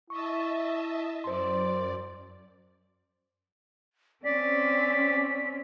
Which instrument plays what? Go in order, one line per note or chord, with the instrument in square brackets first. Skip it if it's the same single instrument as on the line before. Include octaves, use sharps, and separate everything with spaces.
[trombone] E4 [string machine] D#5 E5 A5 [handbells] C#6
[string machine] F#2 D5 [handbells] C5 C6
[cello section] C4 C#4 [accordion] D5 [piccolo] B6